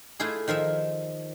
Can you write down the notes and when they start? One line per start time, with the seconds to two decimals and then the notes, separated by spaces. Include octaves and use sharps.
0.20 A3 E4 F4 G#4
0.48 D#3 F3 A#4 E5